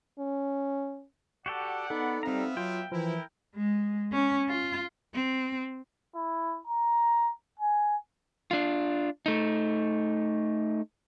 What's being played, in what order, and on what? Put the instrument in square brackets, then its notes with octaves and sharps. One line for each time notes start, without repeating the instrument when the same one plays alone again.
[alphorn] C#4
[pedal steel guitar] F#4 G4 A4 [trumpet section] D5 F#5
[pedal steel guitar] B3 [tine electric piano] D#4 A4
[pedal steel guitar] G3 A#5 [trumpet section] B3 E5 F5 [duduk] C4
[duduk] F#3 [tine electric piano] F4 [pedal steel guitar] G5
[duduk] E3 [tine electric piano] F3 [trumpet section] E4 A#4
[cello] G#3
C#4
F4
C4
[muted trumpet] E4
A#5
G#5
[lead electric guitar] D4 F4
A3 D#4